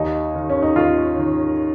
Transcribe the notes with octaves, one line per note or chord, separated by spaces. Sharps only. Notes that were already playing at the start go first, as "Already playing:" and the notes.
Already playing: D#2 D#4
D#3
C#4
D#4
D#2 F4
D#3